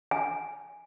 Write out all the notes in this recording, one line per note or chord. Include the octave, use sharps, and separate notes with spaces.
G#5